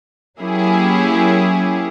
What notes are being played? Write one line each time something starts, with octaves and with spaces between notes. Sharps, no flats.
F#3 A#3 C#4 E4 G4 G#4